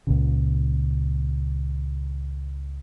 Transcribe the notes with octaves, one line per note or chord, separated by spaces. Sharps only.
C#2 A#2 C#3